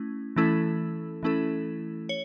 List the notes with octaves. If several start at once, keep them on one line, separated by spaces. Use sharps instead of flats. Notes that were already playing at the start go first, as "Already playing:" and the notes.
Already playing: A3 C#4 E4
E3 A3 C#4 E4 A4
E3 A3 C#4 E4 A4
C#5